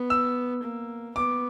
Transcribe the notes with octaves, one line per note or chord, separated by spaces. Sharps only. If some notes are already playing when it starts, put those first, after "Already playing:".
Already playing: B3
E6
A#3
B3 D6